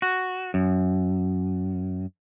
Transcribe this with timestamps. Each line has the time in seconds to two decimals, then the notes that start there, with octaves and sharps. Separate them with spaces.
0.02 F#4
0.54 F#2